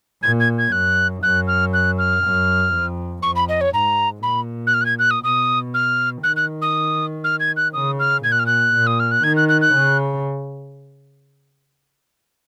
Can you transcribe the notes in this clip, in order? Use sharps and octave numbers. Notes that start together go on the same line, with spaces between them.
A#2 G#6
G#6
G#6
F#2 F#6
F#2 F#6
F6
F#6
F6
F#2
F2
F2 C#6
B5
D#5
C#5
G#2 A#5
A#2 B5
F#6
F6
F#6
G#6
F#6
D#6
B2 D#6
F6
D#3 F#6
F#6
D#6
F6
G#6
F#6
C#3 D#6
F6
A#2 G#6
F#6
F6
F#6
A#2
D#6
F6
F#6
D#3 G#6
F#6
F#6
F#6
C#3